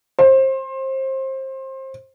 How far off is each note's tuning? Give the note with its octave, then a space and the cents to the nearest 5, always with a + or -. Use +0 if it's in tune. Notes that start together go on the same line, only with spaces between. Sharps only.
C5 +25